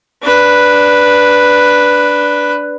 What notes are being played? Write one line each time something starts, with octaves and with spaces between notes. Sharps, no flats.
D4 B4